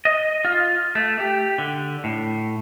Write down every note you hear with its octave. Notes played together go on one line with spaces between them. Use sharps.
D#5
F4
A3
G4
D3
A2